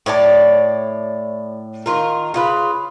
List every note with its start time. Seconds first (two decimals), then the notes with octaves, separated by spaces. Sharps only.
0.06 A2 C#5 D5 A5
1.86 D#3 F4 A#4
2.34 C#3 F4 B4